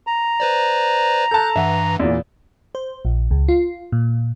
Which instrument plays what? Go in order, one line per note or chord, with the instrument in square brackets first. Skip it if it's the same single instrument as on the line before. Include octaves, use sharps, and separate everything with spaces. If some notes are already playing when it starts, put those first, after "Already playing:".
[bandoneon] A#5
[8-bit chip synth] B4 C5 D5
[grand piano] A4 A5 [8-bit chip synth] F#6 G6
[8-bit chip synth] G2 E3 [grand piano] E5 F#5
[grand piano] E2 A#2
[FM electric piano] C5
A#1
C#2
F4
A#2